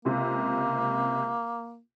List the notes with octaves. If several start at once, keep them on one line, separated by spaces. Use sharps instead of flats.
C#2 C3 A#3